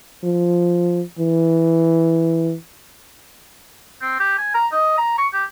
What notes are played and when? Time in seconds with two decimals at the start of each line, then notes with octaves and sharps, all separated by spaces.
0.24 F3
1.19 E3
4.01 C4
4.19 G4
4.38 G#5
4.54 A#5
4.72 D#5
4.98 A#5
5.18 C#6
5.33 G4